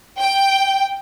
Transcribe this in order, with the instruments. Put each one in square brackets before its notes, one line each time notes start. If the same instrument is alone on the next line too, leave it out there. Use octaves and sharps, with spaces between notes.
[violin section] G5